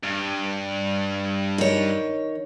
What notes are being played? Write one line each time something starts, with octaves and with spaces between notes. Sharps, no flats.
G2
D#3 C#5